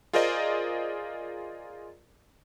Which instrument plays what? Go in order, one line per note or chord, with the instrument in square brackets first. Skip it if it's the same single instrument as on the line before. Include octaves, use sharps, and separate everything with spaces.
[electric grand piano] F4 G#4 A#4 C5 D5 D#5